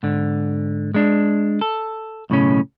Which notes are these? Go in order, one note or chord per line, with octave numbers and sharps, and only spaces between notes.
G#2 D3
G#3 D4
A4
B1 A2 C#3 C#4